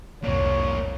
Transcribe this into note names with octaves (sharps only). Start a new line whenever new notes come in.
C2 F2 G#2 C3 A#3 D4 C#5